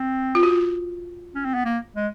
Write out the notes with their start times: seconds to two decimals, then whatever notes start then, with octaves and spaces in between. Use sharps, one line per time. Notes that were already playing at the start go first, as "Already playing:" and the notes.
Already playing: C4
0.35 F4
0.43 F#4
0.51 F4
1.35 C#4
1.45 C4
1.54 B3
1.65 A#3
1.96 G#3